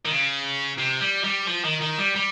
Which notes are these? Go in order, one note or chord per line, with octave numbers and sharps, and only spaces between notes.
D#3
C#3
C3
G3
G3
F3
D#3
D#3
G3
G3